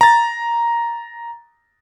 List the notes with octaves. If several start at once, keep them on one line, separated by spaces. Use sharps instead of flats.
A#5 A6